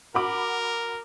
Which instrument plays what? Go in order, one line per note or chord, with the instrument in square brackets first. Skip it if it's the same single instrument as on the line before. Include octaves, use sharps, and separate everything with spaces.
[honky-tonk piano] F#4 B5 D6 [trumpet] A#4